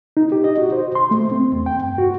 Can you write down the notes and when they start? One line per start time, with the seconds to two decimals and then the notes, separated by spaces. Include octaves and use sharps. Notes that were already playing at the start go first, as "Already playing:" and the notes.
0.17 D#4
0.32 G4
0.44 D#5
0.58 F#4
0.72 C5
0.95 C6
1.11 A3
1.32 C4
1.52 E2
1.66 G5
1.81 G2
1.98 F#4